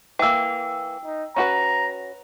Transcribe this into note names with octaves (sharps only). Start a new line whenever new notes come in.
E3 A#3 G5 E6
D#4
C#4 F#4 B4 A#5